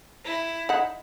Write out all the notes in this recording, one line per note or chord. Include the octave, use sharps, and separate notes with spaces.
E4
D#4 F#5